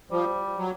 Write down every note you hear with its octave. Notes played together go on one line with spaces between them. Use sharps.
F3 G3
F#3